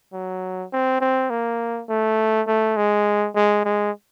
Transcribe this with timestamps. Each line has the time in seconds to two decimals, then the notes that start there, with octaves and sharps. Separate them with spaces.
0.13 F#3
0.72 C4
1.01 C4
1.30 A#3
1.89 A3
2.47 A3
2.77 G#3
3.36 G#3
3.65 G#3